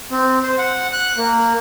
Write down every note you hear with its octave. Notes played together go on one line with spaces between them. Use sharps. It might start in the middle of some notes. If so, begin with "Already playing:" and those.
C4
C5
F#5
F#6
A#3